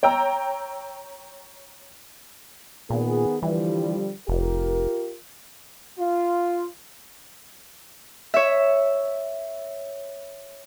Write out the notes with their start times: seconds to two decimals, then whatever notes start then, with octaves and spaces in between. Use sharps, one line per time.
0.03 C#5 G5 A#5 E6
2.90 A#2 D#3 B3 G#4
3.43 D3 E3 F3 G3
4.28 F1 F4 G4 A#4
5.99 F4
8.34 C#5 E5